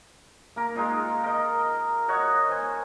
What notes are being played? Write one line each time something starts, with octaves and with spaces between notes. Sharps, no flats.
A#3 A#4
G#3 D#4 F4
A#4 D#5
F#4 C#5 D#5 F#5
C5 G#5